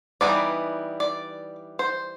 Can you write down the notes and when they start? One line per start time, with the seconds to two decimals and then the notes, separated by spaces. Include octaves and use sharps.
0.21 E3 G3 B3 D#4 D5
1.00 D5
1.79 C5